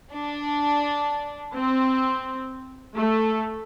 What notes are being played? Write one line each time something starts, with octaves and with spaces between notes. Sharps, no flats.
D4
C4
A3